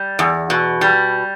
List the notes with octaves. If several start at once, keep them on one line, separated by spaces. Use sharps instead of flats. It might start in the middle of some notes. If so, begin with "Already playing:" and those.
Already playing: G3
E2
B2
G3